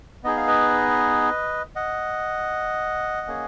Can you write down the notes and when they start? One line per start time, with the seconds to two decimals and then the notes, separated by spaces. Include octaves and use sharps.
0.24 B3 D#4 G#4 D#5
0.36 F5
0.48 B4 D#5
1.76 D#5 F#5
3.27 A#3 C#4 G#4